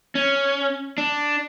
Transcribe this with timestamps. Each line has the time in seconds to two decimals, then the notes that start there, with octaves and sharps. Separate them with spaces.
0.15 C#4
0.98 D4